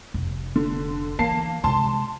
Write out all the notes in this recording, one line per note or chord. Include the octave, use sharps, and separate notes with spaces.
F1
D3
E3 A#3 A5 C7
C3 G#3 A5 C6